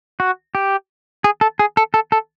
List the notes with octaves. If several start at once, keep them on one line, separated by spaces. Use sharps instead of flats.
F#4
G4
G#4
A4
G#4
A4
A4
A4